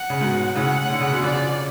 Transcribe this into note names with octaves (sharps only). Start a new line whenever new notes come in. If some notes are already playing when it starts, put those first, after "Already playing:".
Already playing: F#5
C#3
G#2 B2
A2 C#3 F#5
D3
C#3
B2 D3
C#3 F3 D5